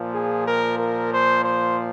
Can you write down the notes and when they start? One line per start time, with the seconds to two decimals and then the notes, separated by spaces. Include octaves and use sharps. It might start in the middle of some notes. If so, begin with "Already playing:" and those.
Already playing: A#2 F3
0.13 G#4
0.46 A#4
0.78 A#4
1.12 C5
1.44 C5